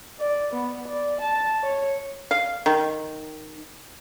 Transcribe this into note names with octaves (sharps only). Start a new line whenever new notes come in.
D5
B3
D5
A5
C#5
F5
D#3